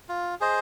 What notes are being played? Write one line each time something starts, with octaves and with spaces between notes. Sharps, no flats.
F4
G#4 C5 D#5